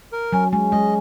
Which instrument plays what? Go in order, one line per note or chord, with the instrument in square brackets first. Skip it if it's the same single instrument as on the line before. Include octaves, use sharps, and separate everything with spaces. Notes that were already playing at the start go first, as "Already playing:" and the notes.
[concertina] A#4
[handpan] F#3 [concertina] C#4
[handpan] G#3 [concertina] C#4
[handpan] G#3 [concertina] D#5